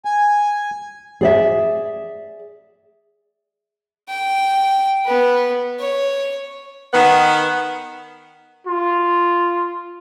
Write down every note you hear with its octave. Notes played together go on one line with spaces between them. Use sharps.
G#5
G#4 D5 E5
G5
B3 B4
C#5
D#3 B3
F4